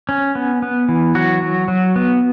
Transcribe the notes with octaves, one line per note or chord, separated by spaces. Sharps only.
C#4
B3
B3
E3
F#3 F#4
F#3
F#3
B3